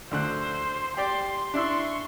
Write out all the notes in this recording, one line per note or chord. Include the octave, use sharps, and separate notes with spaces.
D2 D3 C5 F#6
G4 D5 C6
D4 E4 C6 C#6 E6